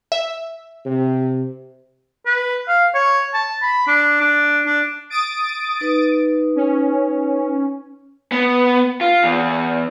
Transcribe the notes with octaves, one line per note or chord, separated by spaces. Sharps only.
E5
C3
B4
F5
C#5
A5
B5
D4
D4
D4
D#6 A6 D7
D#4 B4
C#4
B3
F4
E2